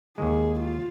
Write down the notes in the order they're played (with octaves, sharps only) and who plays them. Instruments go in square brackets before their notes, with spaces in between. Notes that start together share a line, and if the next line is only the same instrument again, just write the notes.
[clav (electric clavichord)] D#2 D#3 G#3 [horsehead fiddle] G#4
[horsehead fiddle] F4